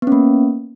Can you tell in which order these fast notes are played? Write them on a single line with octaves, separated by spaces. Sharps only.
B3 C#4 A#3